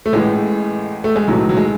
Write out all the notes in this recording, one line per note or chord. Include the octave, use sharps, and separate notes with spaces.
A3
A1 A2 E3 G#3
A3
G#3
B1 A2 E3 F#3
F#3
G#3